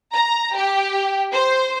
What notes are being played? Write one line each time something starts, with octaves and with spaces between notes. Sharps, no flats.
A#5
G4
C5